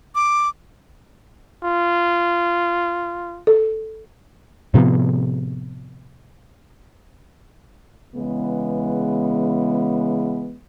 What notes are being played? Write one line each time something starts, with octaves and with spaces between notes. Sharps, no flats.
D6
F4
A4
A2 C3 F3 B3
C#3 E3 G#3 B3